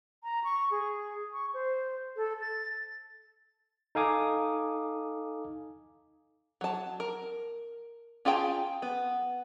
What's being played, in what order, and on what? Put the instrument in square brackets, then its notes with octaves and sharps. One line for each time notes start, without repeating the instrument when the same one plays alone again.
[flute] A#5
C#6
G#4
C#6
C5
A4
A6
[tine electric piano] D#4 A4 F5 G#5 D6 D#6
[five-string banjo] F#3 A5
A#4
C#4 F4 G#4 G5 A5
B3